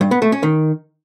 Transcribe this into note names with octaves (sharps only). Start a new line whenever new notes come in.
G2
B3
A3
C#4
D#3